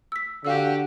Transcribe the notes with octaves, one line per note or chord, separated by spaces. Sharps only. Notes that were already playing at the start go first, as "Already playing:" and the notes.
E6 B6
D3 F#4 G4 F5 E6